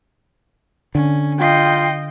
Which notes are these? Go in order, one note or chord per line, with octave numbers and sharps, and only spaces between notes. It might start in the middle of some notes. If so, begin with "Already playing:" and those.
D3 C#4
F4 D#5 G5 C7